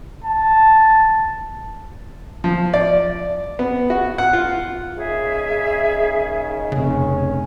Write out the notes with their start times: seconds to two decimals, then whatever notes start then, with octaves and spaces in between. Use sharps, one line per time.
0.24 A5
2.44 F3
2.74 D5
3.59 B3
3.90 F#4
4.18 F#5
4.33 F4
4.96 D#2 C#3 D#4 G#4 E5
6.72 F1 C#3 C#4